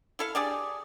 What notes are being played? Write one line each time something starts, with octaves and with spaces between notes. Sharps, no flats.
E4 A4 F5
D4 G4 G#4 D5